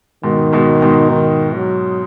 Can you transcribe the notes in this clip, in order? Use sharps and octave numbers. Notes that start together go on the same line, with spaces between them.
G#2 B2 D#3
G#2 B2
G#2 B2
D#3
F#3